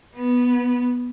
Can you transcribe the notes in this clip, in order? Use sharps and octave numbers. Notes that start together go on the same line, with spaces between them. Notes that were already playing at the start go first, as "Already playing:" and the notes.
B3